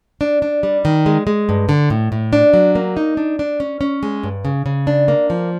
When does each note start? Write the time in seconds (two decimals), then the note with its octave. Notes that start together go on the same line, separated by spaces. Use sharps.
0.21 D4
0.42 D4
0.63 G3
0.85 D#3
1.06 G#3
1.27 G#3
1.49 G2
1.69 D3
1.90 A2
2.12 A2
2.33 D4
2.53 F#3
2.75 A#3
2.97 D#4
3.17 D4
3.39 D4
3.60 C#4
3.81 C#4
4.03 G#3
4.23 G2
4.45 C#3
4.66 C#3
4.87 D4
5.08 A#3
5.30 F3